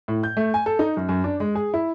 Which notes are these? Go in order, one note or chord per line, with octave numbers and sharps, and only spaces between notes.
A2
G6
A3
G#5
A4
D#4
F#2
F#2
D4
G#3
G#4
E4